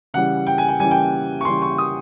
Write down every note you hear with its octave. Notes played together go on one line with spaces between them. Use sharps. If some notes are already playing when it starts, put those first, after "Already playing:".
C#3 E3 G3 F#5
G5
G#5
G5
C#3 E3 G3 G#5
G5
C#6
C#3 E3 G3 C6
C#6
D#6